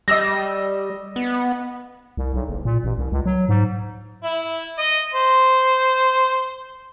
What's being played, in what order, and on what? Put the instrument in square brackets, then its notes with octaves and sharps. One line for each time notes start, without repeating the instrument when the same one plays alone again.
[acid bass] G3 [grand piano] D#5 E6 A#6
[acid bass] B3
[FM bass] C2
B1
F#1
A#2
A1
C2
C#2
F#3
G#2
[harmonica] E4
D#5
C5